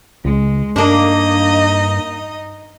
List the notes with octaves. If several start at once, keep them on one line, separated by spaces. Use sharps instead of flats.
C#2 G#3
G2 A#3 D4 D#4 D#5